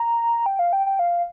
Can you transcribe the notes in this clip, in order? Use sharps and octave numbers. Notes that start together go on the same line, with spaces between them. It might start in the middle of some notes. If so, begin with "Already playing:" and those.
Already playing: A#5
G5
F5
G5
G5
F5